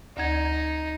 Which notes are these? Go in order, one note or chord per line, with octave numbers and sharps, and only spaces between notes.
D2 D#4 F#5 G#6